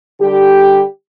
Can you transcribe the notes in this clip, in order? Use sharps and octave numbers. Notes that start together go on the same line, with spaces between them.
D3 G3 G4